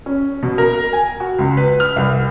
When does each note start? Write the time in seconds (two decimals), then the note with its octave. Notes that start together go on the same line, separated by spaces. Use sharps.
0.06 C#4
0.43 B2
0.58 A#4
0.93 G#5
1.20 F#4
1.39 C#2
1.57 B4
1.80 F6
1.96 C2